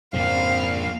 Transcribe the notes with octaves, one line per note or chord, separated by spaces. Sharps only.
F2 G#2 C#3 F3 A#3 C4 F5